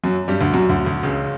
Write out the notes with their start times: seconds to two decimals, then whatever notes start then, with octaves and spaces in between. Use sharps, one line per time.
0.04 F#2 F#3
0.28 G2 G3
0.41 D2 D3
0.53 F#2 F#3
0.69 D2 D3
0.86 D2 D3
1.03 C#2 C#3